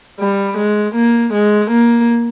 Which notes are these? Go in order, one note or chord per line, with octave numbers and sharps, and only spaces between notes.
G3
G#3
A#3
G#3
A#3